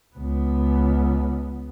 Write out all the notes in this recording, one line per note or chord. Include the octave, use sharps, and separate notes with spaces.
C#2 B3